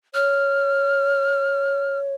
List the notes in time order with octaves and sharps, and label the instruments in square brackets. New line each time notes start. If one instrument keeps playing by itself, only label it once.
[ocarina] C#5 [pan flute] F6